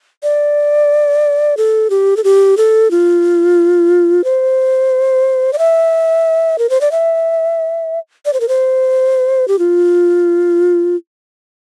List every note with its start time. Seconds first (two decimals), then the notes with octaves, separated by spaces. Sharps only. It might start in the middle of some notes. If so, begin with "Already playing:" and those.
0.23 D5
1.57 A4
1.90 G4
2.17 A4
2.24 G4
2.57 A4
2.91 F4
4.24 C5
5.53 D5
5.58 E5
6.59 A#4
6.70 C5
6.81 D5
6.92 E5
8.25 D5
8.33 C5
8.40 A#4
8.49 C5
9.48 G4
9.59 F4